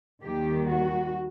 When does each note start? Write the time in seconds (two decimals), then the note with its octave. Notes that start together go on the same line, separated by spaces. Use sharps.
0.23 D#2 D#3 G3 G4
0.69 F#4